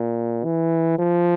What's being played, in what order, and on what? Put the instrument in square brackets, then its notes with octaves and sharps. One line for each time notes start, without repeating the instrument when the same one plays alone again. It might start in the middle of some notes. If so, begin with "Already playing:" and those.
Already playing: [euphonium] A#2
E3
F3